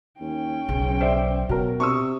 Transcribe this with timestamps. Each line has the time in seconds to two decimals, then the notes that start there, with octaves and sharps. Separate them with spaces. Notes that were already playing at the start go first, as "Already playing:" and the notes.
0.20 D#2 C#4 G5
0.69 B1 C#3
1.00 C5 D5 E5
1.49 B2 F#3 F#4 A#4
1.80 C3 C#6 D#6 E6